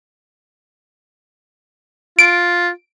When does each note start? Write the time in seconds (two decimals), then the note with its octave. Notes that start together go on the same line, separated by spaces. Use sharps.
2.19 F4 D7